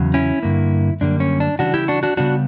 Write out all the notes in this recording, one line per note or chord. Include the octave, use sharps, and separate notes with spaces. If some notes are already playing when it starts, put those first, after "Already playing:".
Already playing: E2 C#3 F#3
C#4 E4
G2 D3 A#3
F#2 D3 G3 A#3 D4
C#4
D4
C#3 E3 G3 D4 F#4
E4 G4
D4 F#4
D4 F#4
C#3 G3 B3 D4 F#4